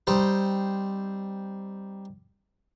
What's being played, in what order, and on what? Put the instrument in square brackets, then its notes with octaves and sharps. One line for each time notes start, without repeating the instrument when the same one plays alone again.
[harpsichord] G3 C4 D#4